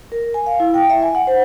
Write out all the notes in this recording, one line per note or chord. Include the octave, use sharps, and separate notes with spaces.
A#4
G#5
F5
E4
G5
E5
G#5
F#5
C5